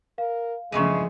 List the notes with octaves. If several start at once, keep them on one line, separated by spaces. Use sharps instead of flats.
A#4 F5
E2 G2 C#3 F3 G#3 A3 C#6 D#7